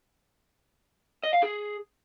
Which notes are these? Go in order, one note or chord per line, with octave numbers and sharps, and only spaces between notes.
D#5
F5
G#4